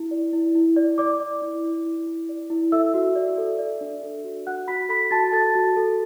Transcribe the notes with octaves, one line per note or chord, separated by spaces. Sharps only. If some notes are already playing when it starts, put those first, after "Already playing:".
Already playing: E4
D5
E4
E4
D5
D5 D6
D5
E4
E4
E4
E4
D5
E4
A4 E5 E6
F#4
D5
A4
D5
D4
A4
F#4
F#4 F#5 F#6
F#4 B5 B6
A4 B5 B6
F#4 A5 A6
A4 A5 A6
F#4
A4